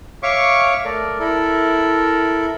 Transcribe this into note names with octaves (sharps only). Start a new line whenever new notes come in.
C#5 E5 F5 C#6 D6
A3 A#4 D5
E4 A4 A#4